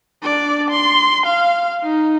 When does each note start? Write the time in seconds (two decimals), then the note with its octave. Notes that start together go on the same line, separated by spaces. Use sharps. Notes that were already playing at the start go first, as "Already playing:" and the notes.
0.23 D4 D5
0.71 C6
1.26 F5
1.85 D#4